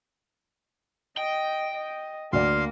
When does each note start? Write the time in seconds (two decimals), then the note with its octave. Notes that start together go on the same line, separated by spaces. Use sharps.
1.18 D#5 G5
1.74 D#5
2.33 D2 A#3 D5 F5 C6